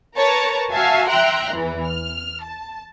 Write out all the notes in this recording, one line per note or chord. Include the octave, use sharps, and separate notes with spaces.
A#4 B4 C#5 A5 A#5
F#4 E5 F5 G#5 A5
E5 G5 A#5 C6 F#6
E2 E3
F6
A5